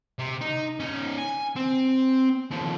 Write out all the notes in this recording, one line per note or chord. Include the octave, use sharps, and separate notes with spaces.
C3
D#4
C#4 D#4
G#5
C4
D#2 F3